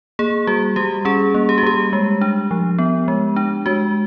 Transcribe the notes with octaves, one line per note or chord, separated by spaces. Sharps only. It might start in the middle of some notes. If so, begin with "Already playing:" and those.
A#3 G#4
G3 F#4
G3 G4
C#4 G#4
A#3
G4
F#4
G3 G4
G#3
D4
F3
B3
G#3
D4
G#3 F#4